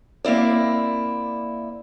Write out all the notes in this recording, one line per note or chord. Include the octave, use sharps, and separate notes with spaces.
A#3 C4 E4 D5